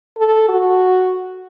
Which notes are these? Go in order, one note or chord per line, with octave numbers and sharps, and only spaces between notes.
A4
F#4